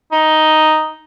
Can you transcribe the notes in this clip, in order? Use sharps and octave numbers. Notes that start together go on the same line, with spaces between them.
D#4